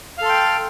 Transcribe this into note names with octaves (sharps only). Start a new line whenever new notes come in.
A4 F5 G5 C6